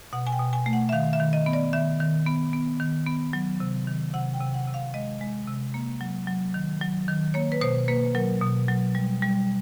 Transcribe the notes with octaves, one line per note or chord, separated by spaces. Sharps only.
B2 F#5
G#5
G5
B2
G#5
A3
F#5
E5
D#3 F5
E5
D#3
D#5
B3
D5
D#3 E5
D#3
B3
B3
D#3
B3
F#3
C3
D#3
C3 F#5
G5
C3
F#5
C3
F5
G#3 D#5
G#3
C3
A#3
F#3
F#3
D#3
F#3
D#3
A#3 C#5
B4
B2 C5
A#3 B4
F#3 A#4
B2
F#3
G3
G3